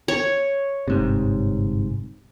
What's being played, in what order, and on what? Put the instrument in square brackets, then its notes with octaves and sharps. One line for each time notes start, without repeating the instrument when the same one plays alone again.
[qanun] C#5
[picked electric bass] G1 G#2 C3